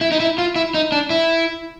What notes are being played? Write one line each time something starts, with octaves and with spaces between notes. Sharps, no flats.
E4
D#4
E4
F4
E4
D#4
D4
E4